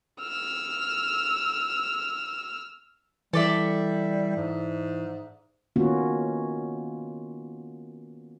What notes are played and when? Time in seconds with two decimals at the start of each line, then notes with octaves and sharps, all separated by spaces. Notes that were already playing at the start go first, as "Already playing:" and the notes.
0.21 E6 F6
3.33 E3 G3 A4 D5 E5
4.36 G#2
5.76 D#3 A#3 B3 C#4 F4 F#4